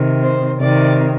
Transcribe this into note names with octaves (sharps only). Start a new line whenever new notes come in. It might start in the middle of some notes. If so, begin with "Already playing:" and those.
Already playing: C3 D#3
C5
C3 D#3 D5